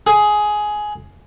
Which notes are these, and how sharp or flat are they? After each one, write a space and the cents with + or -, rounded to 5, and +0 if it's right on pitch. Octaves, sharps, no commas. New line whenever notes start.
G#4 +10